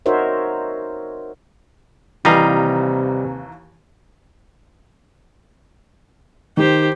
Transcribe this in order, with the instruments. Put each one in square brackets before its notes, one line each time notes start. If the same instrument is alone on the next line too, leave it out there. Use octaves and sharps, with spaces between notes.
[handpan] D#4 F#4 A#4 C5 C#5 E5
[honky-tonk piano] D#2 E3 A#5 [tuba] C3 [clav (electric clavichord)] G3 D#5 F5
[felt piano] D#3 [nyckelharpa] G4 C5